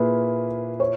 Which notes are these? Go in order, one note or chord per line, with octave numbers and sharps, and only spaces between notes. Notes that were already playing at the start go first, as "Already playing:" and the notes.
Already playing: A#2 A#3 E4 G#4 B4
C#5